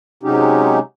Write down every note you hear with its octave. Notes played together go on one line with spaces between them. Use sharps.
C3 F#3 G#3 C#4 D#4 G4